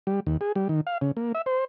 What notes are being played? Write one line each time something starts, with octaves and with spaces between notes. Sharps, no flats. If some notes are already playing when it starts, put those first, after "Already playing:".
G3
D#2
G#4
G3
D#3
F5
C#3
A#3
E5
C5